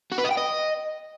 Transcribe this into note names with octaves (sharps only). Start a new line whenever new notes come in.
F#4
B4
D#5
G5
D#5